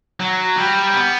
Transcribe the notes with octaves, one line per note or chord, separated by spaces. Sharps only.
F#3
G3
B3